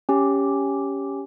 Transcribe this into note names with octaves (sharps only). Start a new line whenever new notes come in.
C#4 G4